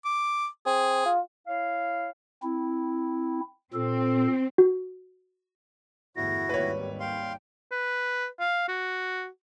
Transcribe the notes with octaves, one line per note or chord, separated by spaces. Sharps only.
D6
C4 G#4
F4
E4 C#5 F5
C4 E4
A#2 C4 A4
F#4
G1 E2 A2 E4 F#4 A#6
G#1 D#2 G3 B4 C#5
F5 G5 C6
B4
F5
F#4